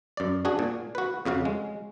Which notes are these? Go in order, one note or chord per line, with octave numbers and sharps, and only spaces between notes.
F#2 D5
D4 F#4 G#4
A#2
F#4 B4
F2 C#3 F#4 F5
G#3